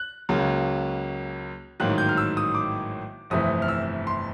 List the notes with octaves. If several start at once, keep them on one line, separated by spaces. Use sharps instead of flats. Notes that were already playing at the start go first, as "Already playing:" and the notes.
Already playing: F#6
C#2 C#3 F#3 A#3
A1 G#2 D#3 F#3 A#3 F#6
G6
F6
E6
D#6
D6
G1 F2 C3 E3 A3 D#6
F6
E6
C6